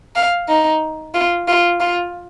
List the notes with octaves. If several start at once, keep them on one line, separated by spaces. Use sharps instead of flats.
F5
D#4
F4
F4
F4